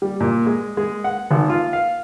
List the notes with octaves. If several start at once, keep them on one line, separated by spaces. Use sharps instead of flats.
G3
A#2
G#3
G#3
F#5
G#1
F4
F5